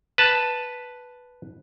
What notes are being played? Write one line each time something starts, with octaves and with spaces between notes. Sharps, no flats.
B4 A5